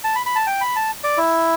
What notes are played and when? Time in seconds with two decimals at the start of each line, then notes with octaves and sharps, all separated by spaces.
0.04 A5
0.15 B5
0.26 B5
0.36 A5
0.47 G5
0.61 B5
0.76 A5
1.04 D5
1.18 E4